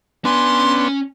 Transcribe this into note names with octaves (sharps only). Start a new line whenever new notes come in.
B3 C#4 D4 G#5 C6